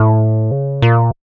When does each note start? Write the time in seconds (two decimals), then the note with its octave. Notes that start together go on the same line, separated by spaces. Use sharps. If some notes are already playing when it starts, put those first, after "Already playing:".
Already playing: A2
0.51 C#3
0.82 A#2